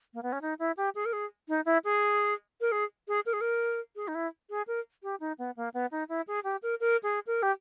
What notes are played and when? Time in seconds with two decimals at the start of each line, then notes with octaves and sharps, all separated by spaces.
0.14 A#3
0.23 B3
0.32 C#4
0.41 D#4
0.59 E4
0.77 G4
0.95 G#4
1.06 A#4
1.13 G#4
1.48 D#4
1.66 E4
1.84 G#4
2.61 A#4
2.72 G#4
3.08 G#4
3.26 A#4
3.33 G#4
3.41 A#4
3.96 G#4
4.08 D#4
4.15 E4
4.50 G#4
4.68 A#4
5.03 G4
5.20 D#4
5.39 B3
5.57 A#3
5.74 B3
5.91 D#4
6.09 E4
6.28 G#4
6.44 G4
6.63 A#4
6.80 A#4
7.03 G#4
7.27 A#4
7.43 G4